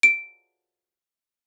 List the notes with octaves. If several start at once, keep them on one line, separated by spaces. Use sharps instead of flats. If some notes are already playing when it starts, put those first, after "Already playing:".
D7